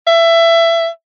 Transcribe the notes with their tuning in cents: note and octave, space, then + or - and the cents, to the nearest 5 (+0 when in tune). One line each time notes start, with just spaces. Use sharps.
E5 +20